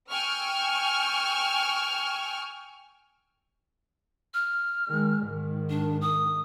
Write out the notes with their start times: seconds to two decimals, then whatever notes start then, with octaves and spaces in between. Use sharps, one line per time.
0.10 G5 G#5 C#6 E6 F6
4.34 F6
4.88 D#3 G#3
5.25 G#2 D#3
5.70 D4
6.01 D#6